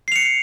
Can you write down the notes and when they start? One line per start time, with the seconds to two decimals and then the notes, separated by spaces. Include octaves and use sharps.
0.08 C7
0.12 F7
0.16 C#7